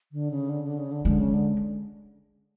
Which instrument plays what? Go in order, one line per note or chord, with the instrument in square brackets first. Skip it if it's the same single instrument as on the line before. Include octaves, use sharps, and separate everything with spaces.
[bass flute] D3
C#3
D3
D3
C#3
D3
[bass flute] D3 [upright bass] G#3
[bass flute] C#3
D3